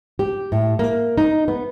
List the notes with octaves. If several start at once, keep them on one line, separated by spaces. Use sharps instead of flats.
G4
A2
A#3
D#4
B3